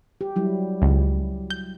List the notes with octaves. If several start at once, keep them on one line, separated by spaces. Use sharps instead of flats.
G4
F#3 G3 E4
C#2
G6